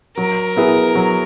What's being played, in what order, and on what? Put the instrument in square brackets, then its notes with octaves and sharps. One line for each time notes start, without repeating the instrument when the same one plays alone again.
[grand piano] F#3 [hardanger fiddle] A#4
[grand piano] B3 E4 G#4
F#3